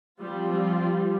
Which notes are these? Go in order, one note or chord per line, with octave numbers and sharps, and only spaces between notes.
F3 G3 C4 F4
G3
G3